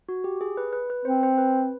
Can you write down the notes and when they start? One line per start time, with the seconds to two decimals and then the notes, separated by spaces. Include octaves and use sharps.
0.09 F#4
0.24 G4
0.41 G#4
0.57 B4
0.73 B4
0.90 B4
1.05 C4 C5
1.23 C5
1.38 B4